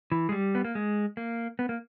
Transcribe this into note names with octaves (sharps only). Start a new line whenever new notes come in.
E3
G#3
G3
B3
A#3
G#3
A#3
B3
A#3